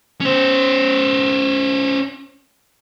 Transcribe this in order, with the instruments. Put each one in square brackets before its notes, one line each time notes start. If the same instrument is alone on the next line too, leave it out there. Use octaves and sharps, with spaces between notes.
[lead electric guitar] C#4 C5